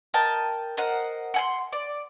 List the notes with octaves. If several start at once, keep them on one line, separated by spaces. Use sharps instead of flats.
A#4 D#5 G5 A5
A#4 C5 D#5 F#5
F#5 G#5 C6
D5